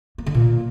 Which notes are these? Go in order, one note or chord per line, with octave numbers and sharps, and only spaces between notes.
A#3
D3
A#2